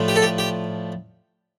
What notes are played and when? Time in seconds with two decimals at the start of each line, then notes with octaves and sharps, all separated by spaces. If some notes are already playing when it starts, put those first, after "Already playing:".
Already playing: A2 F3 A3 D4 F4
0.08 G4
0.16 A4
0.22 G4
0.38 G4